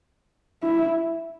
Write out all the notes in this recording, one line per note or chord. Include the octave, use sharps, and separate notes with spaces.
E4